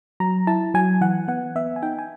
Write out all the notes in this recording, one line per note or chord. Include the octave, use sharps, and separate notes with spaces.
F#3 A#5
E4 A5
F#3 G#5
E3 F#5
B3 F#5
B3 E5
G#5
D#4 G5
G#5